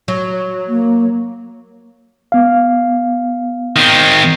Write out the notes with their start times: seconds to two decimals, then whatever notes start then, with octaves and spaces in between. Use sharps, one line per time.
0.08 F#3
0.67 A#3
2.32 B3 F5
3.76 D#3 C4